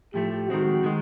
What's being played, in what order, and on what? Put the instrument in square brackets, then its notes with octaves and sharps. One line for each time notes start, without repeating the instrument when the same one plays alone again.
[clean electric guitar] A2 F3 A3 [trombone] G4
[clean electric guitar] D#3 G#3 C4 [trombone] F#4
[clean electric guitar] D#3 G#3